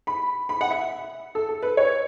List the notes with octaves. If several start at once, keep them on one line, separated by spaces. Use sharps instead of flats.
B5
B5
F#5
E5
A4
A4
B4
C#5